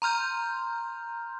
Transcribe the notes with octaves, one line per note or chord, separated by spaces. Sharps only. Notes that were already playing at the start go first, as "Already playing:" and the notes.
A#5 C6 F6 G6